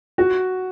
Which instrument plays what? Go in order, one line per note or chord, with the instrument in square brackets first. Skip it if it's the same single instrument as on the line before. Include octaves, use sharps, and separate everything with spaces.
[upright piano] F#4